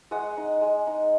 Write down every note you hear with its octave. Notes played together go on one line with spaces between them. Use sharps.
G#3 D#5 F#5
D#4
G#3
D#4